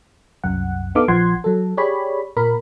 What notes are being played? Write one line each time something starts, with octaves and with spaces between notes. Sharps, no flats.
C2 F#2 F#5
B3 D#4 A4 F5 D6
A#1 F3 F#5 C6 G#6
F#3 A4
G4 G#4 C#5 D5 B5
A#2 A#4 B5